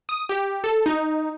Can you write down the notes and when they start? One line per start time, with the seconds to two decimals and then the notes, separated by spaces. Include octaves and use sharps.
0.09 D#6
0.29 G4
0.64 A4
0.86 D#4